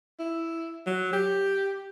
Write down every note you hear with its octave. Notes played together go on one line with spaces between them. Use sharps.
E4
F#3
G4